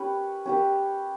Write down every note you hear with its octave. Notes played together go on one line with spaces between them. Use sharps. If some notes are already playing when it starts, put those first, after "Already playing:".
Already playing: C#4 G4 B4
C#4 G4 B4